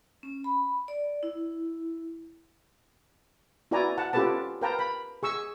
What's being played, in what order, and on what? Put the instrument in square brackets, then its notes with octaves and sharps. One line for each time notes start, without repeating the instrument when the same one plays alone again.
[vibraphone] C#4
B5
D5
E4
[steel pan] E4 F#4 B4 D5 G#5 A#5
F#5 A5
C#4 F4 G4 A4 B4 A5
A#4 B4 F5 G5 A5 A#5
B5
G#4 C#6 E6